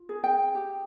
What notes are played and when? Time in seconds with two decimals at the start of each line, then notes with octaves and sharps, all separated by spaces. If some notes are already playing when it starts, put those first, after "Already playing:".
Already playing: F4
0.09 G#4
0.24 G5
0.55 G4